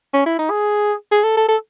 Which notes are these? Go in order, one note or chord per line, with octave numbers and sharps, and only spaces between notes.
C#4
E4
D#4
G#4
G#4
A4
A4
A4